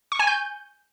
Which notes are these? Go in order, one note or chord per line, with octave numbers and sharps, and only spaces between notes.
C#6
G#5
G6